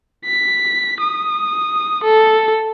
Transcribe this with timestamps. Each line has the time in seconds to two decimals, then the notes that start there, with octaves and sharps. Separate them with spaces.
0.26 B6
1.01 D#6
2.04 A4